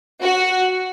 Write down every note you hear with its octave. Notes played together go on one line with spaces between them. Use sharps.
F#4